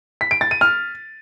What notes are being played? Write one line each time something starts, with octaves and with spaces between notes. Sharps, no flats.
B6
D7
A6
D#7
F6